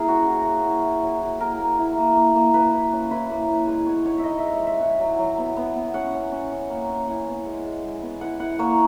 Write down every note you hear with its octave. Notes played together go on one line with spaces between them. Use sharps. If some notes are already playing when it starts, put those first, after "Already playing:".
Already playing: A#3 E4 G#4 A#4
C#4 F#4
E4
A#3
E4
E4
F#3
E4
A#3 A#4
A#3
E4
A#3
A#3
A#3
A#3 B4
E4
C#4
E4 B4
A#3
E4
G#3 B4
B3 C#5
D#4 C#5
E5
D#4 D#5
G#3 E5
F#5
G#3 E5
E4 F#5
F#3
F#3
B3
B3
B3
C#4 F#5
C#4
C#4
C#4
A#3
C#4
E4 F#5
B3
G#3
G#3
G#3
B3
E4 F#5
E4 F#5
A#3 C#5